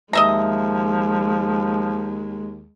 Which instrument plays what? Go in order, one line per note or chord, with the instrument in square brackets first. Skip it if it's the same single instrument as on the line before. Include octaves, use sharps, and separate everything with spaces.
[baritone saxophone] D#2 [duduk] F3 [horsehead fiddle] G#3 [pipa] D#5 E5 A#5